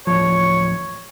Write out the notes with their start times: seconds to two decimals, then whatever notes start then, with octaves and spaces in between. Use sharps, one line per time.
0.07 D1 A1 F3 C#5